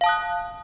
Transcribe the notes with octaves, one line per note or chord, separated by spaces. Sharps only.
F5 A5 D#6 F#6